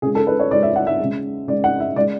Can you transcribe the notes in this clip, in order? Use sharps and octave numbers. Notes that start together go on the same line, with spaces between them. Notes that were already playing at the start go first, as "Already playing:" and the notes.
C#3 G#3 G#4
A4
B4
C#5
C#3 G#3 D5
E5
F#5
E5
C#3 G#3
C#3 G#3 D5
F#5
E5
C#3 G#3 D5